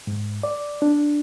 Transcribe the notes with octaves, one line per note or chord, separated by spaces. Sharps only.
G#2
D5
D4